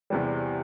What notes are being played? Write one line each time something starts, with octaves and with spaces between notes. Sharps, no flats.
E2 C3 E3 G3